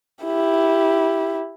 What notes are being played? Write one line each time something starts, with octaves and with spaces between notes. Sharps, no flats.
E4 G4